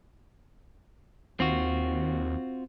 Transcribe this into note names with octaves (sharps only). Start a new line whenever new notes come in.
D#2 C4 F4 F#4